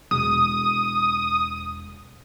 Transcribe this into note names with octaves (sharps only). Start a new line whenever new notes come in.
E1 D#6